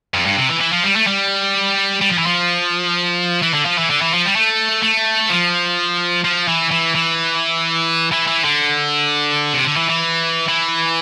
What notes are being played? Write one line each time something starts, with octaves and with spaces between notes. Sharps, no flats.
F2
G2
C3
E3
E3
F3
G3
A3
G3
G3
F3
E3
F3
E3
D3
F3
E3
D3
E3
F3
G3
A3
A3
F3
F3
E3
E3
E3
E3
E3
D3
C3
D3
E3
E3
E3